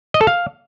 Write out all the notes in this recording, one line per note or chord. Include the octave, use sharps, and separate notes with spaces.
D#5
A4
F5